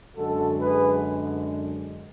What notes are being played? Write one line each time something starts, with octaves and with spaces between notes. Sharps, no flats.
F#2 D3 G#3 F#4 A4
G#4 B4